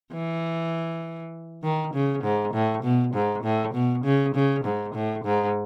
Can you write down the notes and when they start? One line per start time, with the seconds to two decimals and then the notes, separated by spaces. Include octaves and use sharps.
0.13 E3
1.63 D#3
1.94 C#3
2.24 G#2
2.54 A2
2.83 B2
3.15 G#2
3.44 A2
3.74 B2
4.05 C#3
4.35 C#3
4.65 G#2
4.95 A2
5.25 G#2